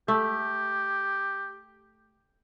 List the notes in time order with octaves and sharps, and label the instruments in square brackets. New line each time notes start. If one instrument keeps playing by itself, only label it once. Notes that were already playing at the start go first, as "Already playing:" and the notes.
[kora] A3 [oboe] G4